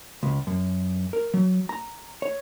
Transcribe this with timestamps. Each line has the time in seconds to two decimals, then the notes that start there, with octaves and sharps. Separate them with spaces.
0.23 C#2
0.47 F#2
1.13 A#4
1.34 F#3
1.69 A#5
2.22 C#5